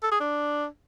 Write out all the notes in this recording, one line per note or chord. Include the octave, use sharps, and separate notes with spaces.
A4
G#4
D4